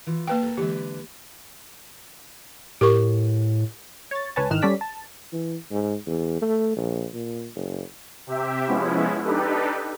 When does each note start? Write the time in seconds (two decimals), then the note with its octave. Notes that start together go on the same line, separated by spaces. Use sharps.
0.07 E3 F4
0.27 A#3 B4 F5 G5 A5
0.43 A4 A#4
0.57 D3 E3 G#3 G4 B4
2.81 A2 G4 A#4 C#6
4.11 C#5 A6
4.36 C#2 B4 C#5 G#5 A5
4.50 G#1 D#3 E3 F6 F#6 E7
4.62 G3 C#4 A4 D5 B6
4.81 A5
5.33 E3
5.71 G#2
6.06 E2
6.42 A3
6.76 A#1
7.14 A#2
7.55 F#1
8.27 C3 G4 E5
8.67 F3 G#3 B3 C#4 E4
9.24 D4 D#4 G4 A4 B4